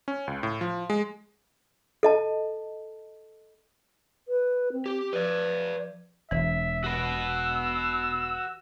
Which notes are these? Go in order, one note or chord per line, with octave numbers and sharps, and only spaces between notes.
C#4
C#2
A2
F3
G#3
A4 D#5 A5
B4
C4
G4
F3 B4 D5
E1 E3 E5
F#4 B4 E6